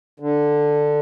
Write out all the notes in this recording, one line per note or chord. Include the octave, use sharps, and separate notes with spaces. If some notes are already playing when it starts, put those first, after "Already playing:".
D3